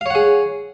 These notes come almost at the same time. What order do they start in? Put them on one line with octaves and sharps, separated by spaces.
F5 C#5 F#5 G#4